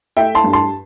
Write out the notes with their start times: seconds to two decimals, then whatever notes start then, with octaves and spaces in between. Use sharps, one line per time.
0.17 A3 E5 G5
0.35 A5 C6
0.44 G2
0.53 A5 C6